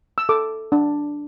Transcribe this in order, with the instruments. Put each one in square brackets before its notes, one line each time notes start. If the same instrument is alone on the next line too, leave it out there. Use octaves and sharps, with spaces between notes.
[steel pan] E6
A4 D6
D4